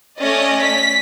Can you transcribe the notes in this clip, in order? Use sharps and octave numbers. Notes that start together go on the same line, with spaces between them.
A3 C#4 D5 D#5
B6